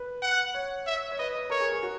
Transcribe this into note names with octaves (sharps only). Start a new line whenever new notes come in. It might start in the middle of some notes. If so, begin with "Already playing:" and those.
Already playing: B4
F#5
C#5
E5
C#5
B4 D#5
B4
A#4 C#5
G#4
G#4
F#4